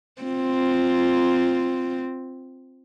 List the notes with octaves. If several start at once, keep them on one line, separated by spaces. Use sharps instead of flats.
C4 F4